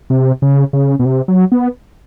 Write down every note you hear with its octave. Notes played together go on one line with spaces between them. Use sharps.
C3
C#3
C#3
B2
C3
F#3
B3